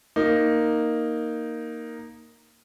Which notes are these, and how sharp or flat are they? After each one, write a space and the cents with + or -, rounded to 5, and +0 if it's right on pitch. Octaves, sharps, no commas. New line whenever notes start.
A#3 +0 D#4 +0